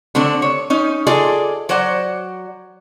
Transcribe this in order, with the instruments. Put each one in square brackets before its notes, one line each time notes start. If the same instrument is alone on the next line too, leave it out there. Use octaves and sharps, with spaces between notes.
[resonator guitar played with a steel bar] D3 A3 C4 D4
C#5
C#4 D#4
F4 G#4 A4 D5 D#5
F#3 C5 D5 F#5